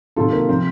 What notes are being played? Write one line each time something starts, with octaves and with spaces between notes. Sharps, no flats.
C3 D#3 F#3 F4 A4
A#3
C3 F3 C4